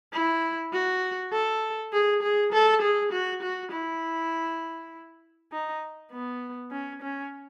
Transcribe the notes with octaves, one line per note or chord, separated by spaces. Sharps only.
E4
F#4
A4
G#4
G#4
A4
G#4
F#4
F#4
E4
D#4
B3
C#4
C#4